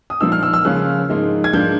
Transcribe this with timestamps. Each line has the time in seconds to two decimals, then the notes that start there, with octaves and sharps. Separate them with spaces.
0.10 D#6
0.21 A#2 F3 A#3 D#4 E6
0.32 F6
0.43 E6
0.53 E6
0.65 C#3 F3 A#3 C#4 F4 F#6
1.09 G#2 F3 A#3 D#4
1.44 G#6
1.53 G#2 F3 A#3 D4 G6